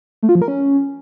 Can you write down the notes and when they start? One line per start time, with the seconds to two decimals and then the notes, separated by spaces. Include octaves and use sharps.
0.23 A3
0.29 F4
0.35 F3
0.42 A#4
0.48 C#4